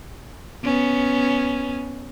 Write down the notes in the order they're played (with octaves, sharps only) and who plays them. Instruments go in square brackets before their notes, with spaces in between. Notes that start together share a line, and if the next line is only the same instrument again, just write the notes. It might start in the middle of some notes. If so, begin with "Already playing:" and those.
[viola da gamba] B3 C#4